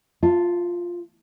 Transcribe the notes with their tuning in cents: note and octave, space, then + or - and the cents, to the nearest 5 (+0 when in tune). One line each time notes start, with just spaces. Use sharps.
F4 +5 E5 +40 A5 +10